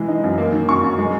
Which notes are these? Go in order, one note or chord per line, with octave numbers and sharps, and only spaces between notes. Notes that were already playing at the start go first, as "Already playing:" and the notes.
Already playing: E3 G#3
D#4
F#2
A#3
D#3
F#2 C#6
F#2
G#3